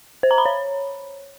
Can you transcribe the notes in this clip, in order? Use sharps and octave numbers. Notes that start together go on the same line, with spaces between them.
C5
A#5
B5
C#5